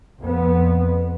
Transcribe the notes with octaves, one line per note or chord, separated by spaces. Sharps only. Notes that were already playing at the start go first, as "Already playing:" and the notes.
F2 B3